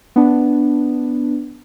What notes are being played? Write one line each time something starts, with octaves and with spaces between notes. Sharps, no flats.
B3 D4